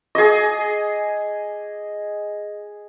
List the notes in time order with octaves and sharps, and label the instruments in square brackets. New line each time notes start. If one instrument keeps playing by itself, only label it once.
[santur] G#4 D#5